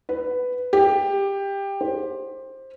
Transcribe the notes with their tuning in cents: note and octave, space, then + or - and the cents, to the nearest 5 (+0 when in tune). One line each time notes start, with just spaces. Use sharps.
B4 +10
G4 +15
C5 +15